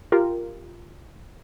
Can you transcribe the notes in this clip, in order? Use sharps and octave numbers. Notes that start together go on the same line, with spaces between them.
F4 G4 A#4